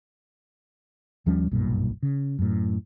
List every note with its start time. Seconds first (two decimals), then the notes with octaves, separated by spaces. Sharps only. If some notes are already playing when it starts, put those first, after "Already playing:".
1.26 D#2 F3 G3 C#4
1.51 F#1 B1 G2 A#2
2.03 C#3
2.39 F#2 A2